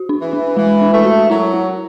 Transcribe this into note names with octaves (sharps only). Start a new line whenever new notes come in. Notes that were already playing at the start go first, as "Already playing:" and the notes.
Already playing: F#4
D4
E3
D4
E3 G#3
D4
A3
F#4
F#3 E4
E4